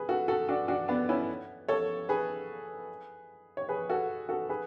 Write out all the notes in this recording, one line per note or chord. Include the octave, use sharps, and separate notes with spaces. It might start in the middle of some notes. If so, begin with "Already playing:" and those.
Already playing: G#4 B4
F#4 A4
F#4 A4
D4 F#4
D4 F#4
B3 D4
C#4 E4
A4 C#5
G#4 B4
C#5
G#4 B4
F#4 A4
F#4 A4
G#4 B4